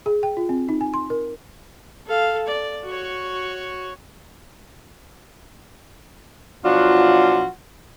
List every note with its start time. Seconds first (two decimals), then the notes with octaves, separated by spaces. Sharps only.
0.06 G#4
0.23 G5
0.37 F4
0.49 C4
0.69 D#4
0.81 G#5
0.94 C6
1.10 A#4
2.07 A4 F5
2.47 D5
2.85 F#4 C#5
6.64 B2 F3 F#3 D4 F4 F#4